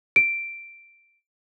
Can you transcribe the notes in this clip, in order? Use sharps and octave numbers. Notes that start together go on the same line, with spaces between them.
D7